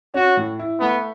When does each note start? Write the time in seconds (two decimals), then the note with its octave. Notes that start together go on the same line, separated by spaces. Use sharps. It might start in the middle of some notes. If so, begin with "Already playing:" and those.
0.14 C#4 F#4
0.37 A2
0.59 E4
0.80 A3 B3